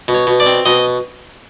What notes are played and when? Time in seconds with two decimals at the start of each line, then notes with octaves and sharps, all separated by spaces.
0.08 B2
0.15 C#5
0.27 B2
0.40 D5
0.46 C4
0.65 B2 D#5